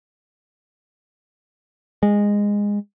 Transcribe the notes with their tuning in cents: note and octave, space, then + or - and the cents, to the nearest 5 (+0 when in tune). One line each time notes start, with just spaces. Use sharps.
G#3 -15